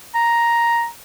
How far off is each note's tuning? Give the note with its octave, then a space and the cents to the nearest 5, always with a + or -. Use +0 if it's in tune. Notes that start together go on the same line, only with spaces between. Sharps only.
A#5 +5